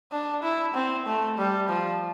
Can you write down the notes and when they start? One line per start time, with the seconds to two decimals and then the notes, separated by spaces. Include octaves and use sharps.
0.12 D4
0.43 E4
0.74 C4
1.06 A3
1.38 G3
1.69 F3